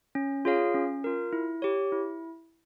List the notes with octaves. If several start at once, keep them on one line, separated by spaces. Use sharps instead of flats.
C#4
F4 G#4 C#5 F5
C#4
F4 A#4
E4
G4 C#5
E4